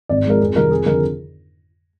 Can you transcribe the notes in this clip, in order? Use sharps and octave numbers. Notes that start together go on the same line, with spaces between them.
G#1 D5
G#2 F3 G#3 A#4
F2 G#4
C3 D#3 G3 A#4
F2 G#4
D3 F3 A#4